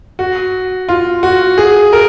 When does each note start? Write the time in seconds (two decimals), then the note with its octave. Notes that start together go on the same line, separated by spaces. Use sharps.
0.19 F#4
0.89 F4
1.23 F#4
1.58 G#4
1.93 A#4